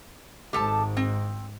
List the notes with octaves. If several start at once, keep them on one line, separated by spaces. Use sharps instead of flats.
G#1 G#2 G4 A4 A5
C4